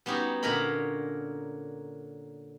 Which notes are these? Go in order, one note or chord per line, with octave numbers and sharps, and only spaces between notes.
G3 B3 C#4 D#4 F#4 G4
A#2 D3 C#4 A#4 D#5 B5